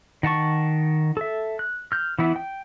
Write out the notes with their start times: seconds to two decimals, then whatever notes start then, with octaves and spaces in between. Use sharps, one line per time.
0.23 D#3 F#5 A5 C#6
1.17 A4 E5
1.59 F#6
1.92 F6 G6
2.19 E3 B3 E4
2.36 G5